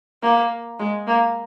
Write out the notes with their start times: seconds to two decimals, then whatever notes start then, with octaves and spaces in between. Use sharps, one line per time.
0.23 A#3
0.79 G#3
1.07 A#3